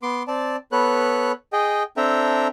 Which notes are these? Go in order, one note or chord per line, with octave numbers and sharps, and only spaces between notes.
B3 C6 D6
C4 D5 A5
B3 A4 B4 C#5 F#6
G#4 D#5 G5
C4 D4 A4 E5 G5 A#5